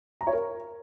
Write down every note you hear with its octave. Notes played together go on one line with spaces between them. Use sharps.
A#5
C#5
A#4